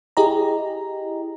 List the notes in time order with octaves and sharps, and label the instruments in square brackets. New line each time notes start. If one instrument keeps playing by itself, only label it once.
[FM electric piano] E4 G4 G#4 D#5 A#5